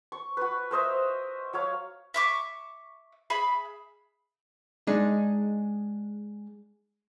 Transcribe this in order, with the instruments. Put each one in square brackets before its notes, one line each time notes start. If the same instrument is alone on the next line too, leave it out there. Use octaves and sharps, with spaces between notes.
[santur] C#6
F#4 B4
A#4 C5 D#5 E5
F#3 C#5 F5
[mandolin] E5 C#6 D6
G#4 E5 B5
[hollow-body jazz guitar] G#3 D4 D#4